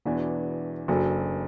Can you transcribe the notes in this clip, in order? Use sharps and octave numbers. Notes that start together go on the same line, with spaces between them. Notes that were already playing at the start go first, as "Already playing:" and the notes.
E1 E2 E3 D4 F#4
F#1 F#2 F#3 D4 A4